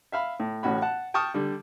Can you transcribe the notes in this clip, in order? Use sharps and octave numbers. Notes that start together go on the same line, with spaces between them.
E5 F5 B5
A2
A1 A2 C#4 F#4 B5
F#5 A5
G5 A5 C#6 D#6 F6
D3 G3